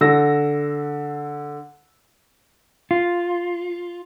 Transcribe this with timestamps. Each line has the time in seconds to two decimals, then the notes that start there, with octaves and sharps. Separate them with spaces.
0.01 D3 E6 A#6
2.91 F4